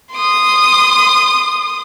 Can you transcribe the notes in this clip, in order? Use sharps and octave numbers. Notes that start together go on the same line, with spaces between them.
C6 D#6